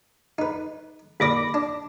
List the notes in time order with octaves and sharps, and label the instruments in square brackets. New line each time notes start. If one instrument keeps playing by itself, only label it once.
[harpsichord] D#4 B4
[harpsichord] D#2 A#2 D5 [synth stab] B5 D6 A#6
[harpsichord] D4